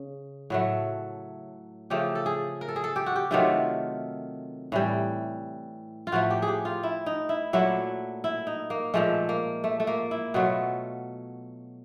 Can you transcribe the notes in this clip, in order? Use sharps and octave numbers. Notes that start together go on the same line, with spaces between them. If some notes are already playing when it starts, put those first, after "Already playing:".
Already playing: C#3
A2 F#3 A3
C#3 F3 A3 G4
A4
G#4
A#4
A4
G#4
A4
G4
F#4
G4
C3 D#3 F#3 A3 F4
A2 E3 G3
F4
A2 F3 A3 F#4
G4
G#4
G4
F4
E4
D#4
E4
A#2 F#3 A3 E4
E4
D#4
A#3
A#2 F3 G#3 A3
A#3
A3
A3
A#3
E4
B2 F#3 A3 F4